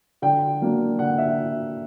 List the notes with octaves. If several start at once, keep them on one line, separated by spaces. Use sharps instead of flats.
D3 G5
F#3 A#3 D4
D3 F#5
E5